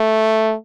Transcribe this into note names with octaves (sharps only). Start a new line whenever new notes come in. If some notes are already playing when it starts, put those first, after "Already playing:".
Already playing: A3